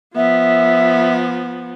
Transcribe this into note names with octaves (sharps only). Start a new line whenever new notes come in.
F3 B3 E5